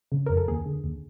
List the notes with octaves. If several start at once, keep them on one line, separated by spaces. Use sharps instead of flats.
C#3
F2 A#4
A4
D#2 G#4
D3
D#2